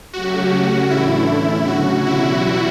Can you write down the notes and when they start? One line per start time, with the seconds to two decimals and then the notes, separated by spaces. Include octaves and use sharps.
0.13 C#3 F#3 A3 C#4 F#4 G4
0.53 C#3 G3 C#4 F#4
0.90 A2 E3 A3 D4 E4 A4
1.29 E2 D3 A3 C#4
1.67 C#3 F#3 C#4 F#4
2.06 E2 B2 G3 E4